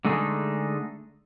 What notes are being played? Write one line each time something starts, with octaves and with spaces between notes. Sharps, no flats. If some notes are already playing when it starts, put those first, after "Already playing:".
D3 G#3 A3 D#4 G#4 A4